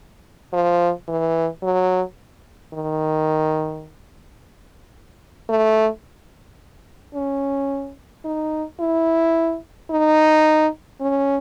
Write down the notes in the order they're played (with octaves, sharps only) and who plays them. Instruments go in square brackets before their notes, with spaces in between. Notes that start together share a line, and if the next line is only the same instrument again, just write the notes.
[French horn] F3
E3
F#3
D#3
A3
C#4
D#4
E4
D#4
C#4